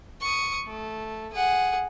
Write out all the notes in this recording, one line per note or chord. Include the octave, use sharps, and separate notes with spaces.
C#6 D#6
A3
G#4 F#5